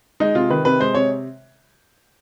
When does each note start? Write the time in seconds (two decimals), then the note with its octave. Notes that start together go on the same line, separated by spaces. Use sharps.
0.20 G#3 D#4
0.35 C3 F4
0.50 D#3 B4
0.65 C3 B4
0.80 G#3 C5
0.94 C3 C#5